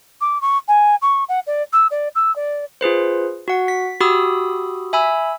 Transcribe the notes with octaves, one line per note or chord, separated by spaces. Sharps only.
D6
C#6
G#5
C#6
F#5
D5
E6
D5
E6
D5
F4 G#4 B4 C5
F#4 F#5
B6
F#4 G4 B5 D#6 E6
E5 G#5 B5 E6